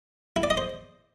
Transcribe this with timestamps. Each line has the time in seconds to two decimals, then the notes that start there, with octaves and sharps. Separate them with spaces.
0.36 E4
0.43 D5
0.50 D#5
0.57 C5